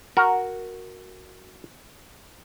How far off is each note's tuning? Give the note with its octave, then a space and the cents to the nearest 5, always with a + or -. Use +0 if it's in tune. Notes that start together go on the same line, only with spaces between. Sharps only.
F#4 +0 A#4 +0